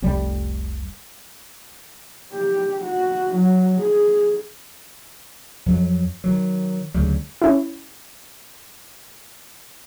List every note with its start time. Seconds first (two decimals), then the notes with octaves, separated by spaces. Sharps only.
0.02 F1 C2 C3 G3
2.32 G4
2.82 F#4
3.35 F#3
3.80 G#4
5.66 F2 F#3
6.24 D#3 F#3
6.94 D2 C#3 F#3 G3
7.42 C#4 E4